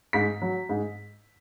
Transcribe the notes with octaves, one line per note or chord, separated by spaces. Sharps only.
G#2 B6
F#3
G#2